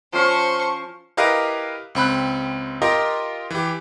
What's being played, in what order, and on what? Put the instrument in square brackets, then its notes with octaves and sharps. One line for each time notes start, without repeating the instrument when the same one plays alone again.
[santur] F3 C#4 F5 [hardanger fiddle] C5 C#6
[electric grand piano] E4 G4 A#4 B4 D#5 F5
C#2 C4 B5 F#6
F4 G4 A#4 D#5
E3 G4